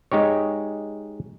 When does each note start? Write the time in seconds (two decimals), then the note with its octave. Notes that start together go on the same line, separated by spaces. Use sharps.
0.12 G#3 D#4 G4 C#5